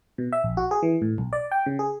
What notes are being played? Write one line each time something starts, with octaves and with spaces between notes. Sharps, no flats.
B2
E5
A#1
F#4
G#4
E3
A2
B1
D5
G5
C#3
G#4